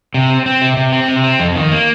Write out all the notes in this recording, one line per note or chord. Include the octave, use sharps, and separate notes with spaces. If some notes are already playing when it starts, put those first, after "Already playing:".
C3
C4
C4
C3
C3
C4
C3
C4
F2
D#3
A#3